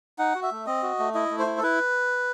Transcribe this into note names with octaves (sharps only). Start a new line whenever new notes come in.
D#4 F#5
F#4
E5
A3
C4 D#5
F#4
A3
E4 D#5
A3
C5
E4
A4
E4 B4